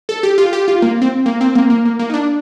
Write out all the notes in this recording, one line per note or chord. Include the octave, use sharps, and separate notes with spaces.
A4
G4
F4
G4
F4
A#3
C4
A#3
C4
A#3
A#3
A#3
A#3
D#4
D4